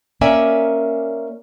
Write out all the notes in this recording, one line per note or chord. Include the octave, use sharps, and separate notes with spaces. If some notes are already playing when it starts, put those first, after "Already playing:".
A#3 C#4 A#4 D5 E5 G#5